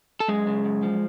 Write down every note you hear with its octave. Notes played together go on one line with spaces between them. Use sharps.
A4
F#2 G#3 G#4
C#3
F#2
F3